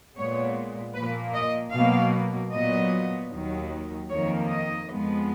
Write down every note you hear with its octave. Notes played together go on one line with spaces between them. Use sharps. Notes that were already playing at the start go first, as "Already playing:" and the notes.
A#2 G#3 B3 C#5
A#2 F3 A#3 B4
D#5
B2 F#3 A#3 F5
A#2 F#3 B3 D#5
D#2 D#3 F#3
F2 D#3 A#3 C#5
D#5
F2 F3 G#3 B3